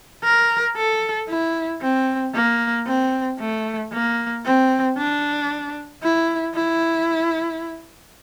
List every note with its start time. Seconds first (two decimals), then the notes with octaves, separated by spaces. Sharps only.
0.24 A#4
0.76 A4
1.29 E4
1.82 C4
2.34 A#3
2.87 C4
3.39 A3
3.93 A#3
4.45 C4
4.98 D4
6.03 E4
6.56 E4